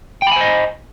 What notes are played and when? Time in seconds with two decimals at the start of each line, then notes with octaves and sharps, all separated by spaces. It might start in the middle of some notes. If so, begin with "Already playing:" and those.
0.22 G5
0.27 B5
0.32 G#5
0.36 C5
0.41 D#5